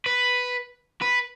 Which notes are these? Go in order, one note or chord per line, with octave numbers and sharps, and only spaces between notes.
B4
B4